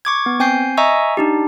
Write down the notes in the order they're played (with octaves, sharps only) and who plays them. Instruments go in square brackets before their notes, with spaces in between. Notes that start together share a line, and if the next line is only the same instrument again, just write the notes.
[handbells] C#6 D6 G#6
B3
C4 G5 G#5 G6 C7
D#5 E5 G#5 A#5 C#6 E6
D4 D#4 G4